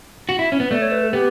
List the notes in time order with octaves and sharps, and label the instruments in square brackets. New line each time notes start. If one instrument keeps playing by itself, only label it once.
[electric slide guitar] F#4
E4
C#4
B3
[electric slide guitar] A3 [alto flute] D5
[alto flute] C#5
B4
A4
[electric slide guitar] B3 [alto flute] G4